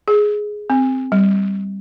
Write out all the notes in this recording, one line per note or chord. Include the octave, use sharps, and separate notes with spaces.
G#4
C4
G3